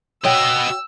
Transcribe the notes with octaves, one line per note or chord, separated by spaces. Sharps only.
F#4 C#5 D#5 G5 E6